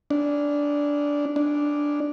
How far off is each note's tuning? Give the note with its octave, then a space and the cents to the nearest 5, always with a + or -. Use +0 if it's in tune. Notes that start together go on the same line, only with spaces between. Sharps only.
D4 -15
D4 -5